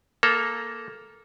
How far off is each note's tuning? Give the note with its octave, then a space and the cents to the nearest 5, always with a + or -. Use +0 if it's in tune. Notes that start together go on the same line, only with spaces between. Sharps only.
A#3 +0 A4 -15 A#5 +0